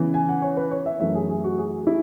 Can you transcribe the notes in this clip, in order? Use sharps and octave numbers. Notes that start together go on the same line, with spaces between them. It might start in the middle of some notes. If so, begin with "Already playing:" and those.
Already playing: C#3 E3 B3
G#5
F#5
C#5
B4
C#5
E5
F#2 E3 A3 E5
G#4
G#4
F#4
G#4
E4